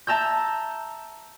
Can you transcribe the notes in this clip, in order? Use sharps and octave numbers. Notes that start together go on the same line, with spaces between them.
E5 A5 A#5 E6 G6